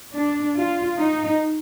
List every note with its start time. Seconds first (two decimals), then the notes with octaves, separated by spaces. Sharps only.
0.15 D4
0.57 F4
1.00 D#4